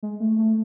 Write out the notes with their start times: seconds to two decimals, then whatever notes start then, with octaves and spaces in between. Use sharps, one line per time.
0.03 G#3
0.20 A3
0.38 A3